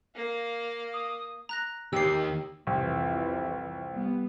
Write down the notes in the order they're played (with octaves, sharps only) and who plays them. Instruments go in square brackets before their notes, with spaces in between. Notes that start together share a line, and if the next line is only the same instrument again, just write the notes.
[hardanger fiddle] A#3 F5
[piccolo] D#6
[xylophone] A#5 F#6 A#6
[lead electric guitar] D#2 D#3 [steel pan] G4 [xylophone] E6 C7
[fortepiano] C2 [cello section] F2 E3
[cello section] G3 B3